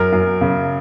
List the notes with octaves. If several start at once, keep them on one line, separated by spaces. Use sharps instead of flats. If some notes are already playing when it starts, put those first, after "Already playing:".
Already playing: F#2 A#4
F#2
C#3